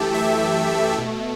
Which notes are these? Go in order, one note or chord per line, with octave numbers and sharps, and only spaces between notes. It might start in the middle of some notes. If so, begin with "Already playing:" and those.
Already playing: F#2 E3 A3 G4 A4
E5
A3
B2